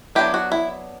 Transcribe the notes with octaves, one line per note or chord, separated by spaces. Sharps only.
F#3 B3 D4 E4 G4
F#4
E4